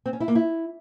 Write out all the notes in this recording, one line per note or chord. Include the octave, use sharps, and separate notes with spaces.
C4
C#4
E4
A#3
E4